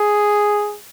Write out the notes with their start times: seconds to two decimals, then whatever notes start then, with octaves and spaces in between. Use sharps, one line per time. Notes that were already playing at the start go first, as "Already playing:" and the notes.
Already playing: G#4